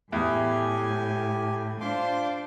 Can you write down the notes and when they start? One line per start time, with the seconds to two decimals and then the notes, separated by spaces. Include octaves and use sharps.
0.12 E2 A2 G4 G#5
1.80 D4 F4 C5 C6 D6